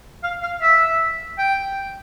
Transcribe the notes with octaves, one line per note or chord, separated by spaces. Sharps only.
F5
F5
E5
G5